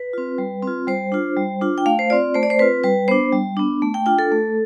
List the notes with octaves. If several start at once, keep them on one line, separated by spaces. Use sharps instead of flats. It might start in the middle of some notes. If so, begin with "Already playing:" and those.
Already playing: B4
C4 F4
G3
C4
F4
G3 C5
D4 F4
G3
D4 F4
G5
A3 F5
C5
C4 F4 D5
A3 C5
D5
C5
C4 F4 B4
G3 B4
B3 D4 C5
G3
B3 D4
A3
G5
D4 F4 G5
A4
A3